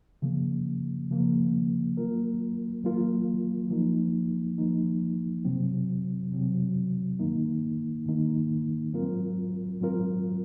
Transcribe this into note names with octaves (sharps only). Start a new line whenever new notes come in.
C#3 F3 A#3
C#3 F3 A#3
F#3 A#3 F4 A#4
F#3 A#3 F4 A#4
F3 A#3 D#4
F3 A#3 D#4
C3 F#3 C4
C3 F#3 C4
G#2 D#3 A#3 D#4
G#2 D#3 A#3 D#4
G#2 F#3 C4 F4 A#4
G#2 F#3 C4 F4 A#4